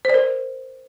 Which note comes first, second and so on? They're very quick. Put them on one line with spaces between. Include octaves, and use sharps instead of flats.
C5 D5 A#4